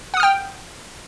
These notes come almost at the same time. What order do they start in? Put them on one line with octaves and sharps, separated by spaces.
F#5 D#6 F6 G5